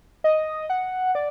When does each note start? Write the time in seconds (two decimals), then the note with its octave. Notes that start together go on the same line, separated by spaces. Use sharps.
0.24 D#5
0.70 F#5
1.15 D5